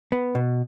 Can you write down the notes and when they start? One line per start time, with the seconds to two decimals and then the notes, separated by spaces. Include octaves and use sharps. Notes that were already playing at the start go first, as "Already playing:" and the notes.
0.12 B3
0.35 B2